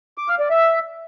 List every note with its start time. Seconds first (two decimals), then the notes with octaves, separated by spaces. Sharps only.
0.18 D6
0.29 F5
0.39 D5
0.50 E5